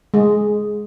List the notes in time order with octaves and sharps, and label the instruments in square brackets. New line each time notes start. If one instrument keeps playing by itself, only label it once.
[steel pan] G#3